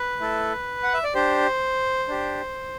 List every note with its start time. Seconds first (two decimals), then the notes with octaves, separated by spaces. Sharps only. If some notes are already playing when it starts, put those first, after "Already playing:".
Already playing: B4
0.20 A3 E4 A4
0.83 F#5
0.94 E5
1.04 D5
1.15 D4 G4 C5
2.08 D4 G4